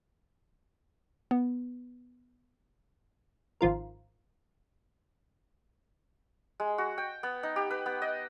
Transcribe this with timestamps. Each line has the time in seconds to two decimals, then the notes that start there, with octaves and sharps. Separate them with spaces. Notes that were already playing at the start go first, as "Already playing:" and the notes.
1.31 B3
3.61 G#1 F3 F4 A#4
6.60 G#3
6.78 F#4
6.98 G5
7.23 B3
7.43 D#4
7.56 G4
7.71 B4
7.86 B3
8.02 D#5